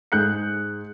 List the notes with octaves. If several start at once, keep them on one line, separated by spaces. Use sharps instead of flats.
G#2 G#4 F#6 G6 C#7